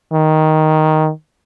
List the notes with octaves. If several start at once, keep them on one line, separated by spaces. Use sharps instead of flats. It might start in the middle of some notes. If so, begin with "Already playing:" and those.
D#3